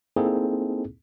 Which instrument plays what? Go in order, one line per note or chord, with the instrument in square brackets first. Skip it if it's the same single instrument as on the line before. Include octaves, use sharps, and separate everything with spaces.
[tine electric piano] A#3 C4 D#4 E4 G#4 A4